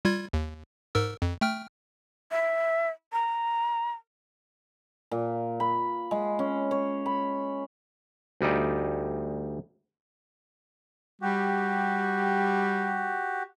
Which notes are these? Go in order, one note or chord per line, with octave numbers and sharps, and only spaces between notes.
G3 F4 G#6
D#2
G#2 A#4 E6
F2
A3 G5 F6
E5
A#5
A#2
B5
G#3
C#4
C#5
B5
D2 G3 D#4 D5
G3 F#4 G4